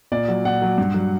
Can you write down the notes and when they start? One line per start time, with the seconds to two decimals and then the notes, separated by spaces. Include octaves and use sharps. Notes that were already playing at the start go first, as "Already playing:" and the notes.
0.12 A#2 D5
0.28 F#3
0.45 A#2 F#5
0.62 F#3
0.78 G2
0.94 F#3